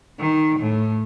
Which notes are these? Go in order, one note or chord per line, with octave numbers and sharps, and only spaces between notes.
D#3
A2